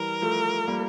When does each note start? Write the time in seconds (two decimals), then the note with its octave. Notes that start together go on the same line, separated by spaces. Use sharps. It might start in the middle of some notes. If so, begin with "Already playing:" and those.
Already playing: E3 G3 A#4
0.22 F3 A3
0.67 G3 A#3